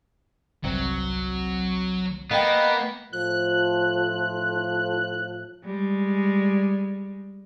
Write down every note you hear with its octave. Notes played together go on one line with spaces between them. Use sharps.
G1 C2 F#3 C4
A#3 B3 D#5 F5 G5
A2 F3 F#6
G3 G#3